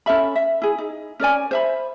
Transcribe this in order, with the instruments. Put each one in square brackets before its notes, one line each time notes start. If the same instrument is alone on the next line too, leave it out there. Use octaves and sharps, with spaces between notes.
[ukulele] C#4 A4 E5 B5
E5
E4 G#4
D#4
C#4 A#4 D5 G#5
C5 E5 B5